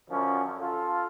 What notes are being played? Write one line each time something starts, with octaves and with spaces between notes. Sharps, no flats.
F#2 D3 F3 C#4
F4 A4